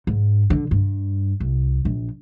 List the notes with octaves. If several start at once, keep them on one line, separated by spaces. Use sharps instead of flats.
G#2
D3
G2
C2
A#1